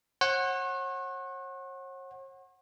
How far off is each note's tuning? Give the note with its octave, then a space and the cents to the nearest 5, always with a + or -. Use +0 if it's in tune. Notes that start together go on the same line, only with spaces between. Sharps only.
C#5 -45 F#5 +0